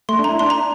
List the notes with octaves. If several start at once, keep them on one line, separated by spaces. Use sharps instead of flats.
A3 C6
D4
E4 A#5
D4 C6
A#5